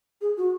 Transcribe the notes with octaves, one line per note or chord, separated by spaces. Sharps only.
G#4
F#4